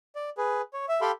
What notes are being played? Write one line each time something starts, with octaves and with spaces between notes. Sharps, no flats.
D5
G#4 B4
C#5
E5
G4 A4 F5 G5 B5 C6